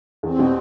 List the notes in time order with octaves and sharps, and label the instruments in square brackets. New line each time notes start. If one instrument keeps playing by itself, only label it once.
[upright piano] E2 [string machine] C4
[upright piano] B2 G3